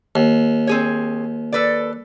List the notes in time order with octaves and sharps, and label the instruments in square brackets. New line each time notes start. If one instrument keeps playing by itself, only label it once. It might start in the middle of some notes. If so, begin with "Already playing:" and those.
[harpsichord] D#2
[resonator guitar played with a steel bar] C4 G#4 C#5
A4 B4 D5